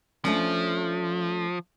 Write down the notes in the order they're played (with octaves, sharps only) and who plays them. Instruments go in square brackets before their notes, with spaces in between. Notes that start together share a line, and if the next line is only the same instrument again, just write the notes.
[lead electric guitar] F3 [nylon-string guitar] A3 C#4 D4